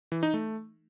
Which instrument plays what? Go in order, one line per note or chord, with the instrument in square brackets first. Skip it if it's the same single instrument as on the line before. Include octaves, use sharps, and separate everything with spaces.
[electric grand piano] E3
D#4
A3